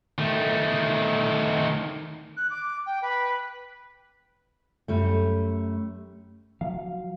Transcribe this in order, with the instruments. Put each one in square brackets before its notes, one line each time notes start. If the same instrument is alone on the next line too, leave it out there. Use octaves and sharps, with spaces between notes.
[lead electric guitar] D#3 A3
[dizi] F#6
D6
G5
B4
[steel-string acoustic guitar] F#2 G3 A3
[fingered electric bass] F3 F#3 [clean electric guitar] F5